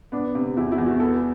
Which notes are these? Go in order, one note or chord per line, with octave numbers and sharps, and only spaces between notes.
B3 D4
C3
E2 E4
E4
E2
F#4
B3 A4